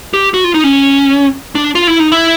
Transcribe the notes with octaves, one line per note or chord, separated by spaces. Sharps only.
G4
F#4
F4
D#4
C#4
D4
F4
E4
D#4
E4